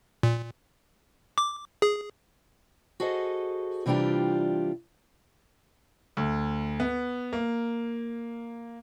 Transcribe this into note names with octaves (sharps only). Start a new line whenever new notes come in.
A#2
D6
G#4
F#4 G#4 A4 C5 D#5
C3 E3 G3 D4 F4 G4
D2
B3
A#3